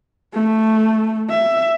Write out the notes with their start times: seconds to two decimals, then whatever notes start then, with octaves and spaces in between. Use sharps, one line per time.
0.33 A3
1.30 E5